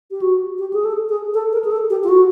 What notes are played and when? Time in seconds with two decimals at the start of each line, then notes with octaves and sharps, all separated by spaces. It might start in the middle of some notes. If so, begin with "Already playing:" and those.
0.11 G4
0.22 F#4
0.59 G4
0.73 G#4
0.85 A4
1.09 G#4
1.34 A4
1.53 A#4
1.64 G#4
1.71 A4
1.90 G4
2.04 F4
2.09 F#4